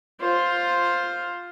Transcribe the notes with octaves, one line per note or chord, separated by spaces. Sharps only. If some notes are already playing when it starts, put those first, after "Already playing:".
F4 C5